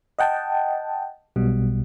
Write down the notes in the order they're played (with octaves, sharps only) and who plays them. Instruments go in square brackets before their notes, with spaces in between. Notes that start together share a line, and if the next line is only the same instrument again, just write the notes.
[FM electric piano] D#5 F#5 G5 A5
B1 B2 G3